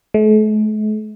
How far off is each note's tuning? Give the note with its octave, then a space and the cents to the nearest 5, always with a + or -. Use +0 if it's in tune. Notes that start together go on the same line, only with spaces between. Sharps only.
A3 -45